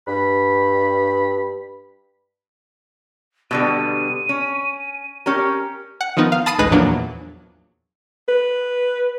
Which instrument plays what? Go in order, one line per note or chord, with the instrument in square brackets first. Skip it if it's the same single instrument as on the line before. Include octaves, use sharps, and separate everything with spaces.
[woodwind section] G2 B5
[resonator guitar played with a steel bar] B2 D3 G3 [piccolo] D#7
[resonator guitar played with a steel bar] C#4
C#4 G4 A#4
[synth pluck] F#5
D#3 F3 B3 D#4
F5
A5 B5 D#6 A6 C7 D#7
A1 D2 G#3 D#4 B4 B5
E2 A#2 F3 F#3 A#3 D4
[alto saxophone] B4